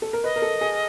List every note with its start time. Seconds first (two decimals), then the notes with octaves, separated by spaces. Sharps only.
0.02 A4
0.13 A#4
0.24 B4 D#5
0.36 A#4
0.42 A4
0.61 G#4